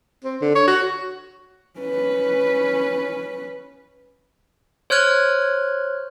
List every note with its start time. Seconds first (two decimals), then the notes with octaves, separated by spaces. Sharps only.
0.25 C4
0.42 D3
0.56 C#5
0.67 F#4
1.79 C#4 B4
4.90 C5 C#5 F6 F#6 G#6